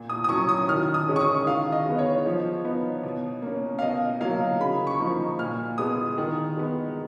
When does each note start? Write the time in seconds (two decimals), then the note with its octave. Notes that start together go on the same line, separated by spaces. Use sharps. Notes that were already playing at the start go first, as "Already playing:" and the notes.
Already playing: A#2
0.09 D#6
0.24 D#6
0.29 F#3 C#4 C#6
0.49 D#6
0.68 D#3 F6
0.94 D#6
1.08 G#3 C#4
1.16 C#6
1.21 D#6
1.46 D#3 F5
1.72 D#5
1.86 G#3 B3
1.98 C#5
2.26 F3
2.65 B3 D#4
3.03 B2
3.42 A#3 C#4
3.79 F5
3.82 B2 D#5
4.21 F#3 A#3 F5
4.60 C#3 B5
4.87 C#6
5.00 F3 A#3 D#4
5.39 A#2 F6
5.78 G#3 B3 D#6
6.18 D#3
6.57 G#3 B3 D#4